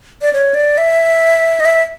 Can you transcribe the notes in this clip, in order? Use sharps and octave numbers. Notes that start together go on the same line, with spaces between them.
D5
C#5
D5
E5
D#5
E5